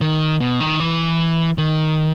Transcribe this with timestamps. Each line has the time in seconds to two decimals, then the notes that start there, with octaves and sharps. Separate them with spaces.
0.01 D#3
0.40 B2
0.60 D#3
0.80 E3
1.58 D#3